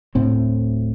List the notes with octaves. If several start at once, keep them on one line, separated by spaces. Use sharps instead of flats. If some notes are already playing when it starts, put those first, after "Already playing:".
D1 D2 A2 C4